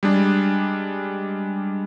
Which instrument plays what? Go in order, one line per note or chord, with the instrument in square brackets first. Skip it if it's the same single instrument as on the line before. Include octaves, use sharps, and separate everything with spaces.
[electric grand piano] G3 G#3 D4